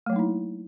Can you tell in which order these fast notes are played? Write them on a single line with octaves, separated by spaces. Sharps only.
A3 F#3 A#3 D#4 E4